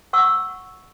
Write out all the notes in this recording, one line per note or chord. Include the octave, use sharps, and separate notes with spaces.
F#5 C#6 E6